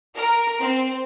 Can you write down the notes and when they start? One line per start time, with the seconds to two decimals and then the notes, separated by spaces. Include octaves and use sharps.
0.16 A#4
0.61 C4